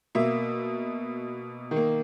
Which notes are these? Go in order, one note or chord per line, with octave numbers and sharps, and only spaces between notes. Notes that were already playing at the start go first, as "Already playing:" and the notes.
B2 A#3 E5
D#3
A#3